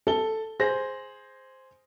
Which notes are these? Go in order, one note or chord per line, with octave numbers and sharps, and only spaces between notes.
A4 G7
G#4 C5 A#6